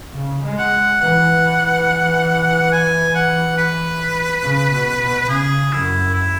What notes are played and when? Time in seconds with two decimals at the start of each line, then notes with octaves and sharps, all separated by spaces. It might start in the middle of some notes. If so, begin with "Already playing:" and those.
0.16 C#3
0.44 G#3
0.58 F#5
1.01 E3 F#5
2.72 G#5
3.15 F#5
3.58 B4
4.43 C#3
4.72 B2
5.00 B2
5.28 C#3 G#4
5.71 F#2 E4
6.14 E4